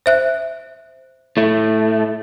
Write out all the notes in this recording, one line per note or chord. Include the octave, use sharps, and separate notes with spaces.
C5 E5 F#6
A2 A3